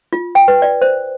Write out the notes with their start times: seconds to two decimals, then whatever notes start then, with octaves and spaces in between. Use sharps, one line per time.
0.13 F4
0.35 G5
0.48 B4
0.62 D5
0.82 C5